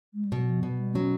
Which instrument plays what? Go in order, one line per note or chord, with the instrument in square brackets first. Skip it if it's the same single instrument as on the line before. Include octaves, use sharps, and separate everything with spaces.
[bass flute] G#3
G3
[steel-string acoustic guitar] B2 [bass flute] F#3
[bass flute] F3
[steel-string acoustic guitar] B2 [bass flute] F#3
[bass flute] G3
[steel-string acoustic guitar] F#3 [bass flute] C#4